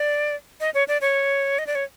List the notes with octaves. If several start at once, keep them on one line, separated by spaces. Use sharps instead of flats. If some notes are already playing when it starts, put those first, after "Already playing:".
Already playing: D5
D#5
C#5
D5
C#5
D#5
D5
C#5